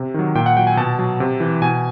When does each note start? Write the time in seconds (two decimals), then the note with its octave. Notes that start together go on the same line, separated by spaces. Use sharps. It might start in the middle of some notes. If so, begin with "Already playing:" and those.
Already playing: C3
0.14 D#3 F#3
0.35 A#2 G5
0.46 F#5
0.57 F#3 G5
0.67 G#5
0.77 B2 A5
0.99 F#3
1.20 C3
1.40 E3
1.62 B2 G#5